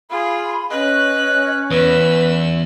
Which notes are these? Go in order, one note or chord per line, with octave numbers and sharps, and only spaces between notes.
F4 G#4 B5
C#4 B4 D#5 F#6
E2 B4 E6